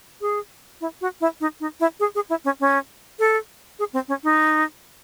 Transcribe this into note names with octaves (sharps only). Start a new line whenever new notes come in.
G#4
E4
F#4
E4
D#4
D#4
E4
G#4
G#4
E4
C#4
C#4
A4
G#4
C4
C#4
D#4